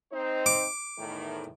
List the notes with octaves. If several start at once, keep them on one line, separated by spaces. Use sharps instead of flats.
C4 D#4 C5
D6
E2 A2 D#3